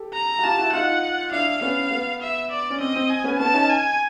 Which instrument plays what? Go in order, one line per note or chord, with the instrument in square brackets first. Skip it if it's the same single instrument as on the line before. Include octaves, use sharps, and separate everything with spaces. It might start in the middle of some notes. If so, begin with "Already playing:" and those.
Already playing: [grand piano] G4 A4
[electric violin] A#5
[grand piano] F#4
[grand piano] F4 G4 [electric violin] A5
[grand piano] E4 F#4
[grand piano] D#4 F4 [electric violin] F#5
[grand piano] D4 E4 [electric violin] F5
[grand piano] B3 C#4 [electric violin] F5
[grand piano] B3
[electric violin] E5
D5
[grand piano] C#4
[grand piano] C4 [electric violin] D#5
[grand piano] C4
[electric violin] G#5
[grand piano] B3 C#4
[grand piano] B3 C#4 [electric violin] A5
[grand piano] C#4 D#4
[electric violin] G#5